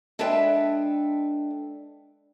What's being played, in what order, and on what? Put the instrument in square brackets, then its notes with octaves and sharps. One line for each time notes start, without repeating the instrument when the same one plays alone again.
[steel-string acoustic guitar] G#3 D4 A4 B4 E5 G5